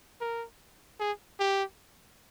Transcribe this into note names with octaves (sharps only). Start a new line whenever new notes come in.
A#4
G#4
G4